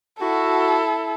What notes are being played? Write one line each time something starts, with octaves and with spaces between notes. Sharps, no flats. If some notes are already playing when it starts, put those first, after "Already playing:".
E4 F#4 A4